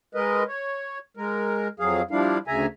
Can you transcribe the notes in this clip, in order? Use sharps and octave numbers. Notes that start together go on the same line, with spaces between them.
G#3 A#4 B4 D#5
C#5
G#3 A#4
F2 F#3 G#4 F5
F3 G3 D4 E4 F5
D2 C#3 E5 G#5 A#5